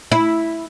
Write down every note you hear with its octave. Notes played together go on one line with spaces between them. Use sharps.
E4